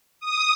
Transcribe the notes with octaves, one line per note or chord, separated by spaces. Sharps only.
D#6